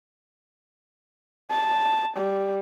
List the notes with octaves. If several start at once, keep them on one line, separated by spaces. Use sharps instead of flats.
A5
G3